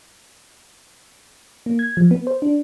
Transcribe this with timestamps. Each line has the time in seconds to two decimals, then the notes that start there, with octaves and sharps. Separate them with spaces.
1.66 A#3
1.79 G#6
1.97 F3
2.11 B3
2.27 C5
2.42 D4